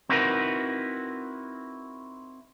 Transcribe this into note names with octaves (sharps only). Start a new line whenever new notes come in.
C4 D#4 E4 F#4 A#4 B4